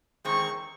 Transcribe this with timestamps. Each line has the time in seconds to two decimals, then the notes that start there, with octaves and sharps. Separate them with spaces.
0.25 E2 D#3 G#3 C4 C#6